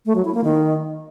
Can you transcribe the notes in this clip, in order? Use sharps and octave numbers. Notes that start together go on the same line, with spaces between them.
A3
F#3
E4
A#3
D#3